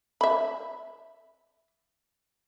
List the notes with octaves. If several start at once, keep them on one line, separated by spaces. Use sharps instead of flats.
E5 B5